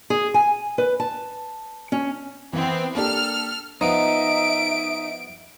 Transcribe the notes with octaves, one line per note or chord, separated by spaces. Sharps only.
G#4
G#5
B4
A5
C#4
E3 B3 C4
A#3 D4 G4 A4 F6
F3 B3 D#4 E5 D7